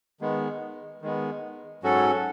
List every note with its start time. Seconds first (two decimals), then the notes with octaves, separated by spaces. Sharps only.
0.21 D#3 G#3 B3
1.02 D#3 G#3 B3
1.83 G#2 F#3 C#4 F#4 A4